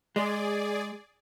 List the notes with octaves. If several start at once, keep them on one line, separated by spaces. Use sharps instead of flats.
G#3 G#4 D5